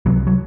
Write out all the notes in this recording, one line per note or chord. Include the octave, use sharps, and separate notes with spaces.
C2 C3 F#3
F#3